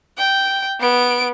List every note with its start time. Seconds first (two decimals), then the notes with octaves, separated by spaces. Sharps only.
0.18 G5
0.80 B3 D7